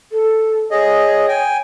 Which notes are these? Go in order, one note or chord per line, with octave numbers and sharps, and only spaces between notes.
A4
G#4 C#5 D#5
G5 G#5